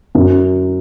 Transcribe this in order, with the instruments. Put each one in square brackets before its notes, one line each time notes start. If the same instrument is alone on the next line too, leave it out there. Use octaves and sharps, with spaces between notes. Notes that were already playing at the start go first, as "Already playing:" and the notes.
[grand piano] F#2